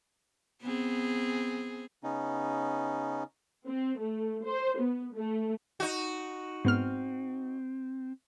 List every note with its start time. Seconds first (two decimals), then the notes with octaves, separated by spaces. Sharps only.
0.62 B3 C4 G#4
2.03 C#3 B3 C#4 D#4
3.67 C4
3.99 A3
4.45 C5
4.80 B3
5.15 A3
5.80 D#4 F#4
6.65 G#2 B3 C4 F6